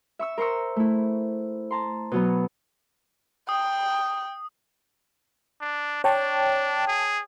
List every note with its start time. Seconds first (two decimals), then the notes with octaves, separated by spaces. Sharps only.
0.19 E5 C#6 E6
0.38 A#4 C5 A#5 C#6 E6
0.76 A3 E4
1.71 A5 A#5 C6
2.11 B2 F#3 B3
3.49 G5 D#6
5.61 D4
6.04 D4 C#5 G5 A5
6.87 G#4